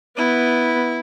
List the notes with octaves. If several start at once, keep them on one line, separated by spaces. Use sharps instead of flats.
B3 E4